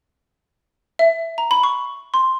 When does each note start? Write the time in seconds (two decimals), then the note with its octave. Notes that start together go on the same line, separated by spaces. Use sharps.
0.99 E5
1.38 A#5
1.51 B5
1.63 C#6
2.14 C6